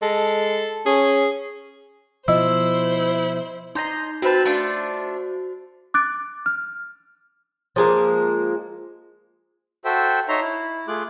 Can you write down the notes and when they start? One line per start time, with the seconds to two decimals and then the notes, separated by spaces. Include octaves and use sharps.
0.02 G#3 A4
0.86 C#4 G#4
2.28 B2 F3 E4 C5 D#5 E6
3.75 D#4 D#5 A#5 C6 G6
4.22 C4 F#4 B4 C5 A5
4.45 A3 D4 F4
5.94 D6 F#6 A6 D7
6.46 F6
7.76 F3 G#3 A#3
9.85 F#4 A4 C5 E5 G5
10.28 D#4 C#5 E5 A#5 C6
10.41 E4
10.88 A3 F4 G#4 D6 F#6